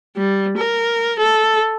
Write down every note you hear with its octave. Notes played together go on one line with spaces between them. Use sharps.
G3
A#4
A4